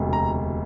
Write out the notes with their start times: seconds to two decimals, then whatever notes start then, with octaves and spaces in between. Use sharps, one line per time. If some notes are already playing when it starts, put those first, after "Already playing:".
Already playing: E1 D2 C3
0.13 A#5